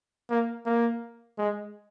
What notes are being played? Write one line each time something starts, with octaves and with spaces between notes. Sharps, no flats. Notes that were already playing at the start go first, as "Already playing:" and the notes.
A#3
A#3
G#3